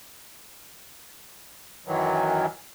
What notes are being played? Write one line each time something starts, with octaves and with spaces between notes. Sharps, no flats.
F#2 D#3 E3 F#3